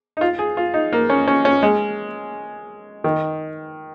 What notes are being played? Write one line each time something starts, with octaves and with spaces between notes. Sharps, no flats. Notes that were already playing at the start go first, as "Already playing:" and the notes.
D#4
F4
G#4
F4
D#4
A#3
C#4
C#4
C#4
G#3
D#3